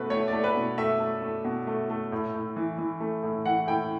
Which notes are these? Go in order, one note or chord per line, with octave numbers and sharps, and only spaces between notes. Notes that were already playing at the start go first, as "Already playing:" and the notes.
Already playing: B2 A3 B4
A3 C#5
D5
A3
B4
B2
A3 E5
A3
A3
B2
A3
A3
A2
A2
E3
E3
A3
A2
E3 F#5
A2 G5